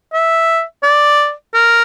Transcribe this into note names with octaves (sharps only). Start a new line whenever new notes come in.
E5
D5
A#4